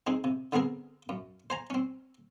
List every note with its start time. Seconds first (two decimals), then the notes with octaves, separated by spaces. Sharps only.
0.07 C4 D#4 G#4
0.24 C3
0.52 D3 B3 C4 G#4 A#4
1.09 F#2
1.50 C5 G#5 A#5
1.70 C4 C#4